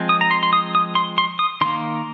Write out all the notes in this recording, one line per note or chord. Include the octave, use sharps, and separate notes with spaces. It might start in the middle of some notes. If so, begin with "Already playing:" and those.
Already playing: F3 G#3 C4
D#6
A#5
C6
C6
D#6
D#6
C6
C6
D#6
D#3 A#3 C6